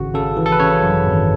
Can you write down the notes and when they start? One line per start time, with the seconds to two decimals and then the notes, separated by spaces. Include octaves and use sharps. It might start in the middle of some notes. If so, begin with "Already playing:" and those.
Already playing: G#1 C#3 F#4
0.14 C#3 A4
0.37 E3
0.46 A4
0.52 B4
0.60 C#3 C#5
0.82 F#2
1.06 G#1